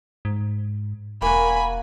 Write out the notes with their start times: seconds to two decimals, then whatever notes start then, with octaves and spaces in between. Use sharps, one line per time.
0.25 G#2
1.22 E1 A#3 F#4 G#5 B5